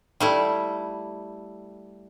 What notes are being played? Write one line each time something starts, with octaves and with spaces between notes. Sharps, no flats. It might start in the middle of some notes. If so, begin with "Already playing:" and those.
G3 A3 E4